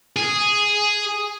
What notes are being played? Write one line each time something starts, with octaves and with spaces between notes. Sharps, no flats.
G#4